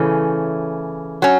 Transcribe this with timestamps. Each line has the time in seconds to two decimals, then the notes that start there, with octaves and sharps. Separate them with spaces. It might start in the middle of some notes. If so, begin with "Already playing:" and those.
Already playing: C#3 E3 A3 C#4
1.22 F#3 C#4